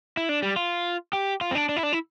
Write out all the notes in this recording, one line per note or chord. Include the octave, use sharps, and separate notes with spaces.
E4
D4
G3
F4
G4
F4
C4
D4
D4
E4
D4
E4